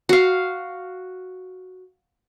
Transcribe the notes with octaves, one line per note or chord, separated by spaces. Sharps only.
F#4 F5